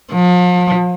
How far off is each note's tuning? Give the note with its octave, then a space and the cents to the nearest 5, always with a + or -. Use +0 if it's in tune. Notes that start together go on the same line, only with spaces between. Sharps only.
F3 +40